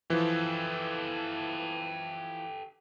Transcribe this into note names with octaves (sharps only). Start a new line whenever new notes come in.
E3 F3 G4 A4